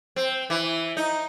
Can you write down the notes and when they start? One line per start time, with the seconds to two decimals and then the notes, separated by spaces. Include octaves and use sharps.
0.16 C4
0.50 E3
0.97 D#4